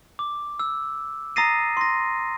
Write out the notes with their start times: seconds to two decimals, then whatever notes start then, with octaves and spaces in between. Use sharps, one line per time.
0.19 D6
0.59 E6
1.36 A#5 D#6 A6 A#6 C7 D#7
1.77 C6 A#6